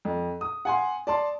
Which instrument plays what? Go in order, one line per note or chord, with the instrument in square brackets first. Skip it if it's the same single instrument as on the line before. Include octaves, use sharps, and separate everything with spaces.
[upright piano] F2
D#6
F#5 G#5 C6
D5 A5 C6